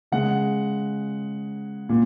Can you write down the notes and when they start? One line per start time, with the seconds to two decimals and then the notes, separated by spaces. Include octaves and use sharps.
0.12 C#3 G#3 F#5
1.89 A#2